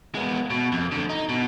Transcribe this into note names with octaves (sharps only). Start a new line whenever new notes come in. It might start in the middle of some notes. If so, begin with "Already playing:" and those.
G#3 B3
B2
F2
D2 D3
D#4
B2